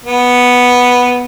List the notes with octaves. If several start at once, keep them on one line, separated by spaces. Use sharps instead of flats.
B3